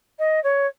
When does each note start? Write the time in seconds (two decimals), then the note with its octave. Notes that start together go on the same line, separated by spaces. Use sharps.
0.19 D#5
0.44 C#5